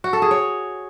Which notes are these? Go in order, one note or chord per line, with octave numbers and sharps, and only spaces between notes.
F#4
A4
G#4
C#5